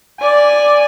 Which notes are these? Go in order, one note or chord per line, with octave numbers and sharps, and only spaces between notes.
D5 G#5